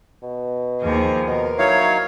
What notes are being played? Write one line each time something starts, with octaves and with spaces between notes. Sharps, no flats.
B2
D#2 F3 G#4
B2 A#4
F#3 D#4 E4 C#5 F5